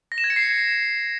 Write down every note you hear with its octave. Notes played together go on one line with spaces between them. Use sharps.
A#6
E7
G#6
C#7
C7